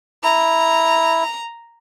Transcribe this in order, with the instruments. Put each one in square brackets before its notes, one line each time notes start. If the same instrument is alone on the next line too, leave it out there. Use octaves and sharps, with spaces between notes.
[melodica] E4 [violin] A#5